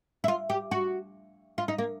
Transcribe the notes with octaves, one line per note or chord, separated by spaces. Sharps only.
E4
F4
G4
F#4
F4
D#4
A#3